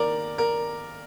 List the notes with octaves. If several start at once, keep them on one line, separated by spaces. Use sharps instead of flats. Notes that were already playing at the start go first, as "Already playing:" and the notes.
Already playing: D#3 A#3 A#4 D5
A#4